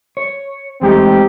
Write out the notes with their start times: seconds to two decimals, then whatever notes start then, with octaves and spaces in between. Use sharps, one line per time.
0.17 C#5
0.81 E2 G#3 A3 C4 D#4 G4